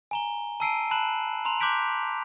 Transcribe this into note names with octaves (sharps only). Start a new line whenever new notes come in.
G#5 A#5 G7
A5 A#5 E6 C7 D7 D#7
A5 B5 F#6 E7 F#7
A#5 C6 F7
C6 D6 F#6 G6 B6 D7